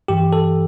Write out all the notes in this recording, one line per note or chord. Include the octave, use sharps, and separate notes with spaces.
G2 E3 G4
A4